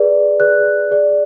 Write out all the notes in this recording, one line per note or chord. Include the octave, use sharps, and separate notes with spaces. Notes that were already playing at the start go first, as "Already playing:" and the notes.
Already playing: G#4 B4 D5
G#4 B4 D5 F#6
G#4 D5